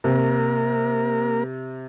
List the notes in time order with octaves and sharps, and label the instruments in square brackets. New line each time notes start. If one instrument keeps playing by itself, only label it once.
[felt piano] C3 [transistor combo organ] A#3 A#4